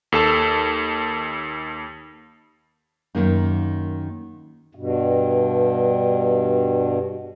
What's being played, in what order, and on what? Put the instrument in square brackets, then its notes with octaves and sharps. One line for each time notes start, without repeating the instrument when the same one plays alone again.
[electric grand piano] D#2 A4 A5
[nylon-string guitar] F#2 D#3 A#3 D#4
[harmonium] G2 B2